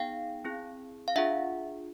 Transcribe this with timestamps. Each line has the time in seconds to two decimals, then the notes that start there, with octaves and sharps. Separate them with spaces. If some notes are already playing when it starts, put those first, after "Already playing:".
Already playing: B3 D#4 G#4 F5 G5
0.45 C4 E4 G#4
1.08 F5
1.16 D4 F4 G#4 E5 F#5